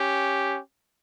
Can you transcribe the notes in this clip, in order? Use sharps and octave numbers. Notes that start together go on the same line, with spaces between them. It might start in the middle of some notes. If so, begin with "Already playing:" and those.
Already playing: C#4 G4